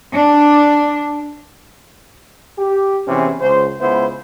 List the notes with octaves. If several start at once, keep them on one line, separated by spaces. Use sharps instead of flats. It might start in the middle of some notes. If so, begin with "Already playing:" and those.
D4
G4
E2 C3 E3 C#4
C#2 C5
C#2 B3 E4 C5